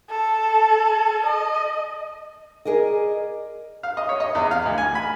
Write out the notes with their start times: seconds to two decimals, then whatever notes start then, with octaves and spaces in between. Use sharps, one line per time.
0.10 A4
1.27 D#5
2.65 G#4 A#4 D5 D#5
3.83 F5
3.97 D#5
4.09 C#5
4.20 D#5
4.35 E2
4.51 F5
4.66 D2
4.78 G#5
4.95 B5